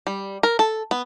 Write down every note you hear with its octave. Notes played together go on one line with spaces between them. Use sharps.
G3
A#4
A4
B3